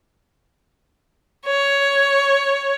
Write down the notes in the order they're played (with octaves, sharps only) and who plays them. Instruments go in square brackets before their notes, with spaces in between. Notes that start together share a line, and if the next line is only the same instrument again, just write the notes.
[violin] C#5